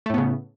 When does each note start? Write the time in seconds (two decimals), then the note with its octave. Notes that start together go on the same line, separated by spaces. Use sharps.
0.06 A3
0.10 A2
0.14 B3
0.18 C#3